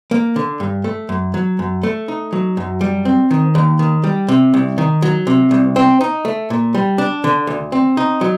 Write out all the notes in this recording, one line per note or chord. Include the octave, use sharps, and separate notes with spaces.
A#3
D3
G2
A3
F#2
F#3
F#2
A3
D#4
F#3
F#2
G3
C4
D#3
D#2
D#3
G3
C3
C2
D#3
F#3
C3
C2
C4
D#4
A3
A#2
G3
D4
D3
D2
C4
D#4
F#3